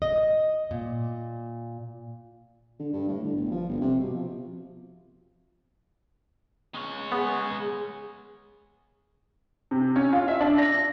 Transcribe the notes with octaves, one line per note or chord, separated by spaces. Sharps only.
D#5
A#2
D3
G2
A2
D3
G1
F3
G1
C3
B2
F3
G#3 C#5
B3 G#4
C3
C#4
F4
E5
D4
A#6